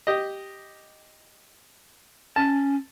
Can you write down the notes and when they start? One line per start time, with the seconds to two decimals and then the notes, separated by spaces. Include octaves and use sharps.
0.07 G4 D#5
2.36 C#4 A5